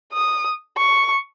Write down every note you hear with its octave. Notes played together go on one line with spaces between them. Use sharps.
D#6
C#6